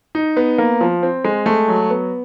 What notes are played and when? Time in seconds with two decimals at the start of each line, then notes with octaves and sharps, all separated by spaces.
0.15 D#4
0.37 B3
0.58 A#3
0.81 F3
1.03 C4
1.24 G#3
1.46 A3
1.68 F#3
1.90 B3